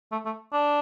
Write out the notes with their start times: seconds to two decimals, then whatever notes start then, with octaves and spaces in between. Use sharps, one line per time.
0.12 A3
0.26 A3
0.53 D4